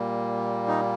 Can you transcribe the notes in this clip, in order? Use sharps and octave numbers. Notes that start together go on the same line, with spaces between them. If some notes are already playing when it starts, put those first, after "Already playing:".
Already playing: A#2 G3 A#3
D#4